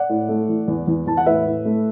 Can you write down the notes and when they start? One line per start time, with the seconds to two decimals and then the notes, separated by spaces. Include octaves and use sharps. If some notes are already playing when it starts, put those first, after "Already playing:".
Already playing: D5 F#5
0.09 A2
0.29 A3
0.48 E3
0.68 E2
0.87 E2
1.07 E2 A5
1.17 F#5
1.26 A2 B4 E5
1.46 A2
1.65 A3